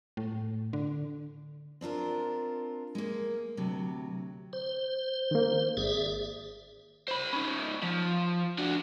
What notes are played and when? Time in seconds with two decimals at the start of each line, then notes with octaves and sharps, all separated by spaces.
0.17 A2
0.73 D3
1.81 C4 D4 F4 A#4
2.95 G#3 A#3
3.57 D2 C3 F#3
4.53 C5
5.31 D#3 A#3
5.77 G#1 G#4 D5 E5
7.08 C5 B5
7.33 C#4 D#4
7.83 F3
8.58 D4 F#4